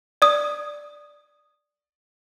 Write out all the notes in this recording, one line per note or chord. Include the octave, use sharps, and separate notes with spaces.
D5 D#6